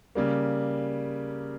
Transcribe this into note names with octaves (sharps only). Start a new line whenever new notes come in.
C#3 G3 A#3